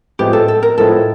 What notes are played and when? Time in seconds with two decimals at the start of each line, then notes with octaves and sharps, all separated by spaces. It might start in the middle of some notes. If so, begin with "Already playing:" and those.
0.19 A2 F3 G#3 B3 E4 G4
0.33 A4
0.48 A4
0.63 A#4
0.78 A2 F3 G#3 B3 E4 A4